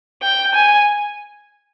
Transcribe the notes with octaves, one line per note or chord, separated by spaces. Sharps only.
G5
G#5